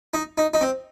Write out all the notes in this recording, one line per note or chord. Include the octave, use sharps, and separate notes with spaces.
D#4
D#4
D#4
C4